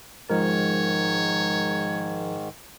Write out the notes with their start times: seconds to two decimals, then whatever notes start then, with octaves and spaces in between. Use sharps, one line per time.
0.30 G#2 D#3 F3 G#3 A#4 C#5